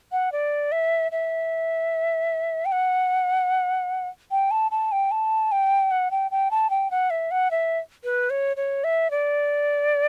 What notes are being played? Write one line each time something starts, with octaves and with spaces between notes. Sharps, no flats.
F#5
D5
E5
E5
G5
F#5
G5
A5
A5
G5
A5
G5
F#5
G5
G5
A5
G5
F#5
E5
F#5
E5
B4
C#5
C#5
E5
D5